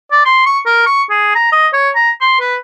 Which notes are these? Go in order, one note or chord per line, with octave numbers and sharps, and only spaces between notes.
D5
C6
C#6
A#4
C#6
G#4
A#5
D#5
C#5
A#5
C6
B4